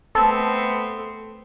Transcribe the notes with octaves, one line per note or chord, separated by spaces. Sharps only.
A3 B3 C4 A4